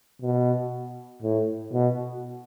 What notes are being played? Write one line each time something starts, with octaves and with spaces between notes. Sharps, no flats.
B2
A2
B2